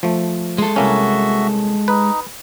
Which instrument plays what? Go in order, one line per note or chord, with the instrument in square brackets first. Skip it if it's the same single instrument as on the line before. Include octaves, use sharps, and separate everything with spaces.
[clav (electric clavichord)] F3 A3
[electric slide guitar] G#3 A4 [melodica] C6
[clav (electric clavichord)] C2 A#3 C#4 [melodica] F#4 E5
[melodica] D#4 [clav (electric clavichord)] B4